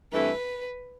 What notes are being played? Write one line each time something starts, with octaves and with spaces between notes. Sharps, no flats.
G2 E3 A3 C4 E4 B4